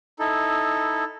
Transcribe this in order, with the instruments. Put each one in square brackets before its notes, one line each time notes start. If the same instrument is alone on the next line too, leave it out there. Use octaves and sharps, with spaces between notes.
[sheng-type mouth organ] D#4 E4 A4